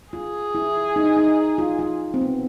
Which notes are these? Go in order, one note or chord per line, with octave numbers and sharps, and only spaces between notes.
F4 G#4
E4
D#4
D#4
F4
F4
C4
B3